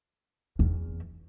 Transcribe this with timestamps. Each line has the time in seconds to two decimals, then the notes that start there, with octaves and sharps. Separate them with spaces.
0.59 E2